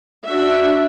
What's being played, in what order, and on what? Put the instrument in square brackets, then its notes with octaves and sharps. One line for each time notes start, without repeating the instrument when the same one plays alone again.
[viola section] D4 F#4 E5